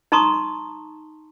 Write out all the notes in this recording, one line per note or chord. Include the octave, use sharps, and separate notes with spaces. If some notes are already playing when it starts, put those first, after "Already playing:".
D#4 A5 A#5 C6 C#6 D#6